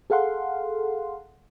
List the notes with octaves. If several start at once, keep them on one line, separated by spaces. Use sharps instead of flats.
G#4 A4 F5 F#5 C6